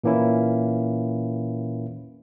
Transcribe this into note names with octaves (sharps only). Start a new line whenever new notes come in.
A#2 E3 A#3 C#4 E4